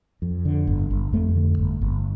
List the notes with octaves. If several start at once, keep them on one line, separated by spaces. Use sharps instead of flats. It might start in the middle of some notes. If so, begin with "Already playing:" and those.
F2
D3
G1
G1
F2 A3
D3
G1
G1